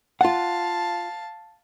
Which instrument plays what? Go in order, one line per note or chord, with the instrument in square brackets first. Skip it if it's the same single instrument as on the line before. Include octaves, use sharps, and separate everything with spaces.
[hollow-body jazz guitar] F4 F#5 [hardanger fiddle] F5 A5